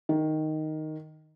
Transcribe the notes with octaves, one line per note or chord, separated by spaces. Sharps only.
D#3